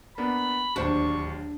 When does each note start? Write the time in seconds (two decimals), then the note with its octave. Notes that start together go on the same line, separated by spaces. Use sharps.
0.18 A#3 B3 D4 B5
0.76 D1 D#2 D4 C5 C#6